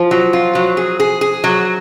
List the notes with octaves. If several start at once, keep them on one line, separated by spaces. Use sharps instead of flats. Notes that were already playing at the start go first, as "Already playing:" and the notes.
Already playing: F3
F#3
F4
F#3
G#4
G#4
G#4
F#3